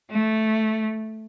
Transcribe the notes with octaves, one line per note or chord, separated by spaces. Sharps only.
A3